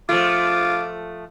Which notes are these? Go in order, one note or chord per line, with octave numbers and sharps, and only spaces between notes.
F3 A3 F4 D6